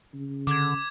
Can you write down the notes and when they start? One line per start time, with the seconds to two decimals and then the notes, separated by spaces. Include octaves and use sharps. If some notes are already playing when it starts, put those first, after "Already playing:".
0.14 C#3
0.47 D3 D6 G#6